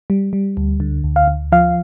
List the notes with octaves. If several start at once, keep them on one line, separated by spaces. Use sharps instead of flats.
G3
G3
D2
D3
D2
F5
D2
F3 F5